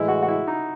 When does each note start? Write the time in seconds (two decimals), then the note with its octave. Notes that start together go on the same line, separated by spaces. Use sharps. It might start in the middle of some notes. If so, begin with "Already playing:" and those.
Already playing: A2 E3 G#3 E4
0.08 F#4
0.23 F#4
0.28 E4
0.47 D#4